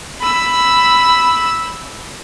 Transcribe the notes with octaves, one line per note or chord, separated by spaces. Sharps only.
B5 E6